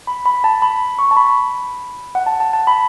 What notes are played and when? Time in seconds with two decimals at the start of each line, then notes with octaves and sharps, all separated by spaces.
0.07 B5
0.26 B5
0.44 A5
0.62 B5
0.99 C#6
1.11 A5
1.17 B5
2.15 F#5
2.26 A5
2.40 A5
2.53 A5
2.67 B5